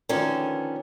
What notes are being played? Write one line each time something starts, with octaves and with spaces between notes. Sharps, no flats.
D3 D#3 F3 A3 B3 C#4